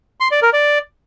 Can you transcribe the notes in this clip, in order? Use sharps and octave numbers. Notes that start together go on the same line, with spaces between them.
C6
D5
A#4
D5